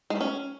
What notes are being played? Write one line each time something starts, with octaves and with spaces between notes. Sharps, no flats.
G#3
A3
C#4